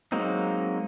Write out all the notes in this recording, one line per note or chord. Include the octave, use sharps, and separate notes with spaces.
F#3 G#3 A#3 C4 D#4